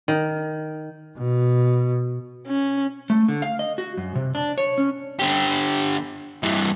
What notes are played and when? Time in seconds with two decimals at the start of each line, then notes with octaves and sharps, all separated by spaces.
0.08 D#3
1.18 B2
2.47 C#4
3.10 A3
3.28 D3
3.42 F5
3.59 D#5
3.78 F#4
3.97 F#2
4.15 C3
4.35 D4
4.58 C#5
4.78 C#4
5.19 D3 G4
6.43 G2 E3